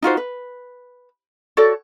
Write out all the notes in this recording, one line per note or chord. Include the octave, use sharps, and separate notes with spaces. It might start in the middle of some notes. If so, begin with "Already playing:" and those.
D#4 F4 F#4 C5
B4
F#4 A4 C#5 D5